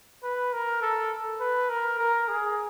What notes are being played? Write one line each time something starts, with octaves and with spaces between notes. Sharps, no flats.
B4
A#4
A4
B4
A#4
A#4
G#4